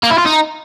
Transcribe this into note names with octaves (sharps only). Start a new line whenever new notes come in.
A#3
E4
F4
D#4